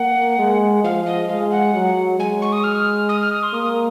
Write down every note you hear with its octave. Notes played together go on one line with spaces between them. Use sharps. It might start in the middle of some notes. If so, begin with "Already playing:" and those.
Already playing: A#3 F#5
G#3
F3 F5
D#5
G#3 F5
F#5
F#3
G#3 G#5
C#6
D#6
F6
D#6
F6
D#6
C6
A#3 D#6